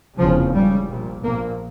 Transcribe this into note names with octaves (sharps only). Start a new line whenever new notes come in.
F1 E2 C#3 F3
C#2 C#3 G3
A#1 A#2
A#1 A#2 A#3